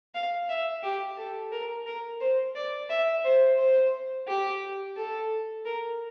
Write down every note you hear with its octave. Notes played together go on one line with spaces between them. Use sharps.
F5
E5
G4
A4
A#4
A#4
C5
D5
E5
C5
C5
G4
A4
A#4